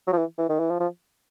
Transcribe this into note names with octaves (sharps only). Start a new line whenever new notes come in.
F#3
F3
E3
E3
D#3
E3
F3
F3